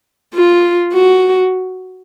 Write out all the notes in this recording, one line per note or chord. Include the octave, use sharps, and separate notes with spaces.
F4
F#4